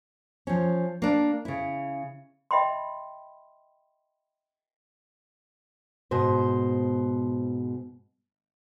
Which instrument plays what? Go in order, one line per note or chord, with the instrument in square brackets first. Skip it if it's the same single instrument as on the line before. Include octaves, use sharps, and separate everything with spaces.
[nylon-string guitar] F3 C#4
A#3 D4
C#3 E4
[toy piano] D#5 E5 G5 B5 C6
[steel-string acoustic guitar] G#2 B2 C5